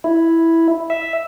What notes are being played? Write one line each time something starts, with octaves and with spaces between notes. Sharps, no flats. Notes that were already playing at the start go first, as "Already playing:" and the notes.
E4
E5